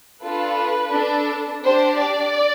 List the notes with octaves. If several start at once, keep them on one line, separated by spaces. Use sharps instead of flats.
D4 F4 A4 B4
D4 A4
D4 G4 C5
D5